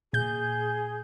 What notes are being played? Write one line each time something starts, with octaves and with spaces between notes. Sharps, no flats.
A#2 G#4 G6